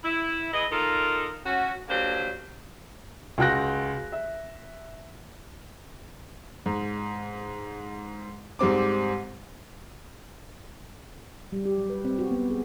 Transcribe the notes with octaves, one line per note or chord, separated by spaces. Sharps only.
E4
E4 G#4 B4 D#5
D#4 F4 A4 A#4
C#4 F#4
D3 F#3 G3 A#3 C5
C#2 F#4 G5 F#6 A#6
E5
G#2
G#2 G3 C4 D6
G3
G4
F#3
B4
C4
F#4
B3
G#4